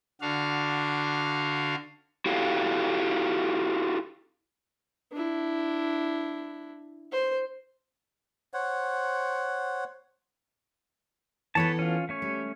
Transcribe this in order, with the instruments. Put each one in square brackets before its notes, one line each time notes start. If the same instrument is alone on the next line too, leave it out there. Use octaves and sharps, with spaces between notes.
[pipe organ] D3 D4 F#4 F5
[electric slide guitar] E4 F#4 G4 A4 F5
[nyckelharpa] D4 E4
C5
[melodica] C5 C#5 F#5
[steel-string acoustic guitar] E3 B3 A4 [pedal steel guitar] B4 C#5 A5
[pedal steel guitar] C#4 F4
A3 C#4 C#5
[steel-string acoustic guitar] G3